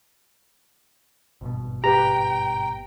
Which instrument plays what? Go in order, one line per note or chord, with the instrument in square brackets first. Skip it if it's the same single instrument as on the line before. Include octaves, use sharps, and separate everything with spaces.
[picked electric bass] G#1 G2 B2
[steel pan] G4 B4 [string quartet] G5 [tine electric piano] A#5